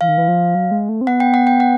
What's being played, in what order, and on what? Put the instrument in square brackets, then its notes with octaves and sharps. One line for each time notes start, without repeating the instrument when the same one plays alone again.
[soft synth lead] E3 [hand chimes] F5
[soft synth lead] D#3
E3
F3
F#3
G#3
A3
C4
[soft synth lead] B3 [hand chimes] F#5
[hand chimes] G5
F#5
G5
F#5